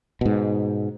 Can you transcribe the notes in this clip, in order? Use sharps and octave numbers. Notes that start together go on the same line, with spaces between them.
G#2 B2